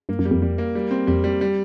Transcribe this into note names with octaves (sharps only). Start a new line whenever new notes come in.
G2 A#3
F#2
G3
F2
F2 G3
A#3
G3
C4
F2 G3
G3
G3